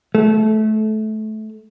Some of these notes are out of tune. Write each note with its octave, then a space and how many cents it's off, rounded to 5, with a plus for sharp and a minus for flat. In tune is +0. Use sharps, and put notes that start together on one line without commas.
A3 -20